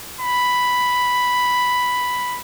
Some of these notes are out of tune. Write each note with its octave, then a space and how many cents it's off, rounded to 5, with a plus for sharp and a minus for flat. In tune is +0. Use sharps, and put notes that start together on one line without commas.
B5 +5